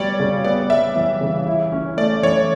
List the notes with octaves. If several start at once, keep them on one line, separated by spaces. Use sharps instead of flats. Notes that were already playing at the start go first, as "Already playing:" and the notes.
Already playing: G3 B3 F#4 C#5 D5
C#3
B3 D5
G3 E5
E3
C#3
E4
C#4
A3 D5
E3 C#5